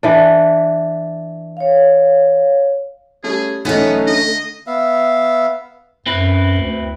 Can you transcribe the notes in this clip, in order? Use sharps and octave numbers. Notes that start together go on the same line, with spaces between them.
E3 D4
C#5 F5
G3 A3 C#4 G#4
B1 E3 A3 B3 C#4 D#4
D3 D#5
B3 E5 F5
F#2 C4 E4 B4
D2